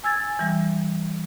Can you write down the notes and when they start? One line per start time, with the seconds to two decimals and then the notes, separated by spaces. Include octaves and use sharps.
0.04 G#5 E6 G#6 A6
0.39 E3 G3